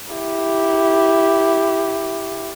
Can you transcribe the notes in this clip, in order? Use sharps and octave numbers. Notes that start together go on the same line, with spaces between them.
E4 G4